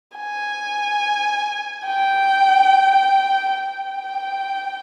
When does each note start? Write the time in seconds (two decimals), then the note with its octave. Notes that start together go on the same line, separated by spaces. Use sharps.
0.17 G#5
1.85 G5
3.53 G5